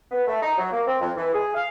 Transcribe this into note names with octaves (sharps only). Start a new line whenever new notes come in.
B3
A3
D#4
F#3
A#3
C4
F2
E3
G#4
F5